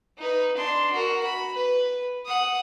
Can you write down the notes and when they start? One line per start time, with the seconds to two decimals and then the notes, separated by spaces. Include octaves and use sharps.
0.18 D#4 B4
0.57 D4 C6
0.93 F#4 A#4
1.23 B5
1.55 B4
2.26 F#5 D#6